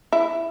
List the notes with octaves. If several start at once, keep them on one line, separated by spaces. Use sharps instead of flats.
E4